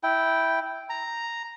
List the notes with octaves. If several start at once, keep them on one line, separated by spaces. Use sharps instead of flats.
E4 G5
A#5